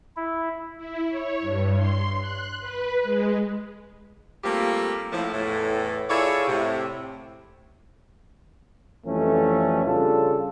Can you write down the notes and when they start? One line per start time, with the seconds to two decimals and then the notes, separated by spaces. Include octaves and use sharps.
0.16 E4
0.77 E4
1.09 C#5
1.41 G2
1.76 C6
2.19 F#6
2.60 B4
3.03 G#3
4.44 G3 A3 A#3 C4 F4 G4
5.12 A2 F3
5.33 E2 A2 E3
6.10 E4 F4 G#4 A4 C#5 D5
6.47 A2 C3
9.07 F2 E3 G3 A3 C#4
9.85 C#3 G3 D4 F4 A4